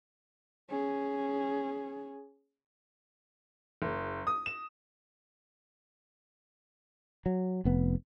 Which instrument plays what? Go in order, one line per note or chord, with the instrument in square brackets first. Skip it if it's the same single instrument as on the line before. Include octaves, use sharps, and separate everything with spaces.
[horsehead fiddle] C#4 G#4
[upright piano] F#1
D#6
E7
[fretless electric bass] F#3
F1 B3